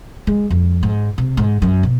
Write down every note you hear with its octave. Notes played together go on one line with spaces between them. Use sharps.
G#3
F2
G#2
C3
G#2
F#2
B2